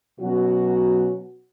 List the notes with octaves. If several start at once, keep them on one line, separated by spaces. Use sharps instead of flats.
B2 F#3 C#4 F#4